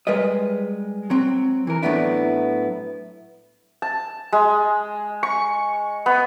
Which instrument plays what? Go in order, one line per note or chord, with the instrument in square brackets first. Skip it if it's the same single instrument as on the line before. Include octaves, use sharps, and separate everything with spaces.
[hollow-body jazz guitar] G3 G#3 A#4 B4 D#5
F#3 C4
E3 A#4
A2 F#3 A3 B3 D4 E4
[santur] A5
G#3
C#6
B3